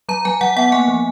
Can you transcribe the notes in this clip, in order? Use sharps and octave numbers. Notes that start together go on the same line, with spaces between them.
F#3 A#5
F#3 G#5
F#3 F#5
B3 F#5
A#3 G#5
F3